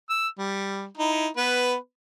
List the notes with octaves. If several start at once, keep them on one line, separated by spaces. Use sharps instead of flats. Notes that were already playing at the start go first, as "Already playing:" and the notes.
E6
G3
D#4 E4
B3 B4